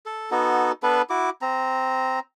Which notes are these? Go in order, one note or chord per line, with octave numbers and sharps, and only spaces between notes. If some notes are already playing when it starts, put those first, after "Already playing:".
A4
B3 D#4 F#4 A4
B3 D4 A4 B4
E4 F#4 D6
C4 A#5